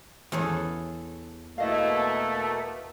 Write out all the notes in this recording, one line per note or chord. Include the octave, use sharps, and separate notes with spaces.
E2 G#4 A4 C#5
B2 A3 A#3 E4 D#5 F5